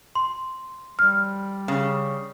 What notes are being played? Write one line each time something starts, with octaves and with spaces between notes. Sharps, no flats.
C6
G3 F6
C#3